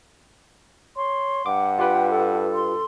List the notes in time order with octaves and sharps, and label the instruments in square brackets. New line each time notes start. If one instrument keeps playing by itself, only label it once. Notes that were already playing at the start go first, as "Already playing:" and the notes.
[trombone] C#5 [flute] C6
[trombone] G2 [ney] F#5 [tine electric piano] D6
[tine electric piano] F4 G4 B4 [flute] G5
[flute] A4
[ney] C6